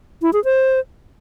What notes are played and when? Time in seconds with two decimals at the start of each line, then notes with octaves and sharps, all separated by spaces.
0.22 E4
0.33 G#4
0.44 C5